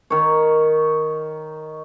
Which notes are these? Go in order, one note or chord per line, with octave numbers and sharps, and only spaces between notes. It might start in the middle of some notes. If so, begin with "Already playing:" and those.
D#3 C#5